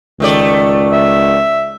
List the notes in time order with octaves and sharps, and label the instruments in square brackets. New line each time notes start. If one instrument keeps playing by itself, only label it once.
[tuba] C#2 [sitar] D#3 A3 D5
[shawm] E5